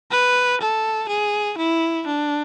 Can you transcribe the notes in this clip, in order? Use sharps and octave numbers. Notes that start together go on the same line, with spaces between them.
B4
A4
G#4
E4
D4